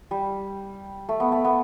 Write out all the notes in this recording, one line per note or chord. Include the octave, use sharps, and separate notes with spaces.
G3
A3
B3
A3
B3